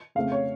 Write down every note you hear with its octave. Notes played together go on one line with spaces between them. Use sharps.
F2 C#3 A3 C4 F5
C#5